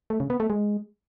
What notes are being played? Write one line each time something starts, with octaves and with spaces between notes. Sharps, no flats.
A3
C#3
B3
A3
G#3